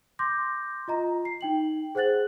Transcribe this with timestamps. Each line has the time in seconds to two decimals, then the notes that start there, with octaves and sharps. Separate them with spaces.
0.19 C6 D6 G6 A#6
0.88 F4 D#5 A#5
1.25 C7
1.41 D#4 G5 F#7
1.95 G#4 C5 F#5 F#6 A6 F#7